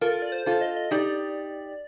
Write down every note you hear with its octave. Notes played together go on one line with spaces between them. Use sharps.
F4 A4 A#4
D5
C5
F4 A4
D#5
D#5
D#4 G4 D5